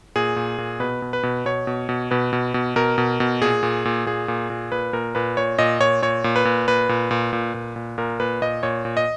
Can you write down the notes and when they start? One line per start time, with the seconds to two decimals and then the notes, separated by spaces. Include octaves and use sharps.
0.16 A#2 G#4
0.36 A#2
0.58 A#2
0.80 B2 B4
1.02 B2
1.13 B4
1.23 B2
1.45 B2 C#5
1.67 B2
1.89 B2
2.11 B2 B4
2.33 B2
2.54 B2
2.76 B2 A#4
2.98 B2
3.20 B2
3.41 A#2 G#4
3.63 A#2
3.85 A#2
4.06 A#2 G#4
4.28 A#2
4.50 A#2
4.72 A#2 B4
4.93 A#2 A#4
5.15 A#2 B4
5.37 A#2 C#5
5.59 A#2 D#5
5.80 A#2 C#5
6.02 A#2 C#5
6.24 A#2
6.36 B4
6.45 A#2
6.68 A#2 B4
6.89 A#2
7.11 A#2
7.33 A#2
7.54 A#2
7.76 A#2
7.98 A#2 A#4
8.20 A#2 B4
8.42 A#2 D#5
8.63 A#2 C#5
8.85 A#2
8.97 D#5